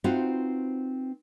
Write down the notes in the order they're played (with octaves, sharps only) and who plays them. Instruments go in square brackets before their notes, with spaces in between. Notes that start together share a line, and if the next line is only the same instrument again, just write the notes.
[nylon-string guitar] C4 D#4 F4 F#4 B4 C5